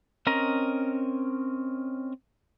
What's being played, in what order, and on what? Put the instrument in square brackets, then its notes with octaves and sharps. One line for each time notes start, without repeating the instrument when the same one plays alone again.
[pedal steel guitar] C4 C#4 A#4 D#5 A#5